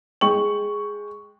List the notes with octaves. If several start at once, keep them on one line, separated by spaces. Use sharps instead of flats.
G#3 G5 C#6 F#7